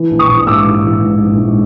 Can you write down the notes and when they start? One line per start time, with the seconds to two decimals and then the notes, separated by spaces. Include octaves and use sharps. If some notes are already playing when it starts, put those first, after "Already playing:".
Already playing: E3
0.11 A#1
0.19 C#6 D#6
0.29 A#1
0.46 G#2 D6 E6
0.66 G#2
0.84 E3
1.02 G#2
1.20 A#1
1.38 G#2